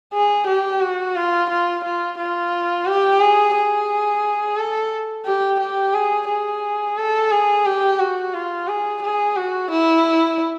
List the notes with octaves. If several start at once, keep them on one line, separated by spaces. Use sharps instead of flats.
G#4
G4
F#4
F4
F4
F4
F4
G4
G#4
G#4
A4
G4
G4
G#4
G#4
A4
G#4
G4
F#4
F4
G#4
G#4
F#4
E4